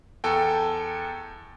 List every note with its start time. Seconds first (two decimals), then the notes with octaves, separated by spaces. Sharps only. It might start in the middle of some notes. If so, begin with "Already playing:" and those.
0.24 E2 A4 G5